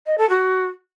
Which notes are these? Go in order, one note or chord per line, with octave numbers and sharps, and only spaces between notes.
D#5
A4
F#4